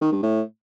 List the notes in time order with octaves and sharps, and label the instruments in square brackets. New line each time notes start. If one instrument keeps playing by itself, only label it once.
[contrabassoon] D#3
G2
A2